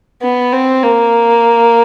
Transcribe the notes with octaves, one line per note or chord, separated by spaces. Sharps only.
B3
C4
A#3